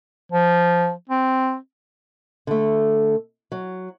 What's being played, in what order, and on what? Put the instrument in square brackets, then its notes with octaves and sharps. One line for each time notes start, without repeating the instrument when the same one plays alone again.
[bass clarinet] F3
C4
[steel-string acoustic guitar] D3 A3
F#3